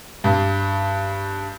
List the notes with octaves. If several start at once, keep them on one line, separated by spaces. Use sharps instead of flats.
G2